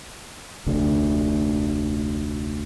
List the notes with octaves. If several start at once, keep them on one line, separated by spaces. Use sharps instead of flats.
F1 D2 D3